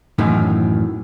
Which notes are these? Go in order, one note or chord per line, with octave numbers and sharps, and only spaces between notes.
F#2 A2 D#3 E3